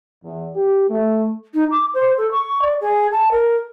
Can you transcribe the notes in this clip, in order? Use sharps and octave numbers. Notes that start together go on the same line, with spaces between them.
E2
G4
A3
D#4
D6
C5
A4
C#6
D5
G#4
A5
A#4